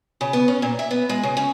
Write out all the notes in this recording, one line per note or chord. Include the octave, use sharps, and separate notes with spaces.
C#3
B3
C#4
A#2
E5
B3
G#3
C#3
C#4